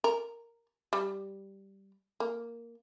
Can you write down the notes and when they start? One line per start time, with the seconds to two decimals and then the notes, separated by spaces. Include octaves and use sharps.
0.04 A#4
0.93 G3
2.20 A#3